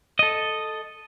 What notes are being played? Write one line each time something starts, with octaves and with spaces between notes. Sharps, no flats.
A4 D#5